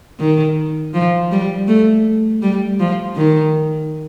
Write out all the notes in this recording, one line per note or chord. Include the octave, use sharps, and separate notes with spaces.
D#3
F3
G3
A3
G3
F3
D#3